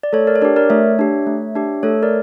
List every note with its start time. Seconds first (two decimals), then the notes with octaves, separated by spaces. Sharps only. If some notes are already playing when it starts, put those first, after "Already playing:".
0.03 D5
0.13 A3 A4 C#5
0.27 A#4 D5
0.36 C#5
0.41 D4 G4 A#4 D5
0.56 A#4 D5
0.70 A3 C#5 E5
0.99 D4 G4
1.27 A3
1.55 D4 G4
1.83 A3 A4 C#5
2.03 A#4 D5